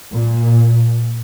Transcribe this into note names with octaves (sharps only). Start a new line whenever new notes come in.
A#2